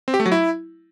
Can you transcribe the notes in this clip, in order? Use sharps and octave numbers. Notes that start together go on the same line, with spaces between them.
C4
G4
A3
F#3
E4